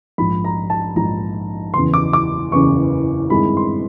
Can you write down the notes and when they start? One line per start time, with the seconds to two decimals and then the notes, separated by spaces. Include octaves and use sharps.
0.18 A#1 G#2 F3 B5
0.44 A#5
0.70 A5
0.96 A#1 G#2 F3 A#5
1.74 F#1 E2 C#3 E3 C6
1.94 D6
2.13 D6
2.52 F#1 E2 C#3 E3 C#6
3.30 G2 D#3 G#3 C4 E4 B5
3.57 C6